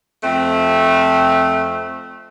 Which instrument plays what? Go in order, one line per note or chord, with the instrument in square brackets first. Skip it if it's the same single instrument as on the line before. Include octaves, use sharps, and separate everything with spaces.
[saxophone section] F2 A3 C4